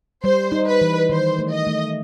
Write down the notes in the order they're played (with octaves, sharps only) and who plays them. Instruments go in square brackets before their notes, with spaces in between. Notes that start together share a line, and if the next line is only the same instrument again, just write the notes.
[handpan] G3 [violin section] C5
[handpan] D#4
[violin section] B4
[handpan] E3
[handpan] D#3 [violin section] C5
[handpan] A3
[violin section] D#5
[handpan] A3